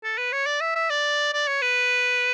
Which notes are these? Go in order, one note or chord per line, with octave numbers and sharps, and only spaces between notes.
A4
B4
C#5
D5
E5
E5
D5
D5
C#5
B4